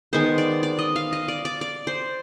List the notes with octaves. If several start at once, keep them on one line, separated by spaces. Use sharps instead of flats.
D#3 G#3 B3 C5
D5
D5
D#5
F5
D#5
D5
D5
D5
C5